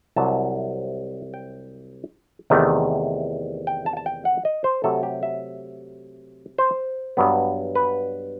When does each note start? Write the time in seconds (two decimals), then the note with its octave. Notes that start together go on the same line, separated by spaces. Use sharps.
0.16 C2 C3 F#3 A5
1.34 G5
2.50 E2 C3 D#3 A3
3.67 G5
3.86 A5
3.97 A5
4.06 G5
4.25 F#5
4.45 D#5
4.64 C5
4.84 C3 F#3 A3 A4
5.03 G4
5.23 E5
6.58 C5
7.17 G2 F#3 B3
7.75 B4